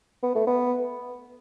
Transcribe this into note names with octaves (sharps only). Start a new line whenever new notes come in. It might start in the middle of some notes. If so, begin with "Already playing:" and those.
B3
A3
B3